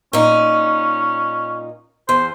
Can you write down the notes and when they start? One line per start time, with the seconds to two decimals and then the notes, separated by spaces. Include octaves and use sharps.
0.13 A#2 C#4 D#4
2.09 E2 C5